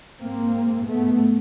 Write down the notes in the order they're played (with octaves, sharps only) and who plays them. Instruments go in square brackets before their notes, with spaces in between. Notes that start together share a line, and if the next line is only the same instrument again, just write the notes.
[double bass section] G#2 A#3 C4
A3 B3